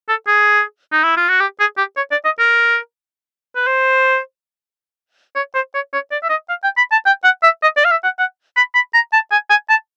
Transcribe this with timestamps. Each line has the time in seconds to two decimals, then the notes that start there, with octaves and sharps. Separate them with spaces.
0.09 A4
0.27 G#4
0.92 D#4
1.04 E4
1.16 F4
1.29 F#4
1.40 G4
1.59 G#4
1.77 G4
1.97 C#5
2.11 D5
2.25 D#5
2.39 A#4
3.56 B4
3.67 C5
5.35 C#5
5.55 C5
5.74 C#5
5.93 C#5
6.11 D5
6.23 E5
6.29 D#5
6.49 F5
6.63 G5
6.77 B5
6.92 A5
7.06 G5
7.24 F#5
7.43 E5
7.62 D#5
7.76 D5
7.85 F5
7.91 E5
8.04 F#5
8.19 F#5
8.56 B5
8.74 B5
8.94 A#5
9.13 A5
9.31 G#5
9.50 G#5
9.69 A5